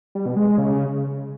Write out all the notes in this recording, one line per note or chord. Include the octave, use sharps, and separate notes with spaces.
G3
B2
G#3
G#3
C#3